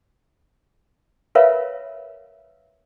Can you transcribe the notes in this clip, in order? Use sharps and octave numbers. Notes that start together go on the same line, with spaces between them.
F4 A#4 B4 C#5 E5 F5